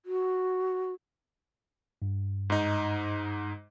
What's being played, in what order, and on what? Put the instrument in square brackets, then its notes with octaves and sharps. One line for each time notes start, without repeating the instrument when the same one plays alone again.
[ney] F#4
[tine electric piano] G2
[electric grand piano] G#2 D#4